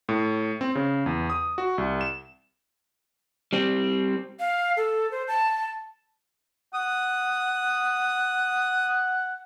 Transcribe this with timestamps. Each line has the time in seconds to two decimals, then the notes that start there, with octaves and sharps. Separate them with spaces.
0.09 A2
0.61 C4
0.75 C#3
1.06 E2
1.30 D#6
1.58 F#4
1.78 C2
2.01 E7
3.53 G3 C4
4.40 F5
4.77 A4
5.11 C5
5.28 A5
6.74 F#5 D#6